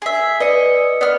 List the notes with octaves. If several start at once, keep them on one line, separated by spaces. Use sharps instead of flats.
G#4 E5
B4 D5 D#5 C#7
B3 D5 F6